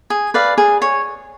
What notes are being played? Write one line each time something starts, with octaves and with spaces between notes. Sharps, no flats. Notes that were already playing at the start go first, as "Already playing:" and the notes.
G#4
B4 D5 F5
G#4
C#5